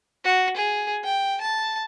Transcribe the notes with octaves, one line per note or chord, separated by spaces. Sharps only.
F#4
G#4
G5
A5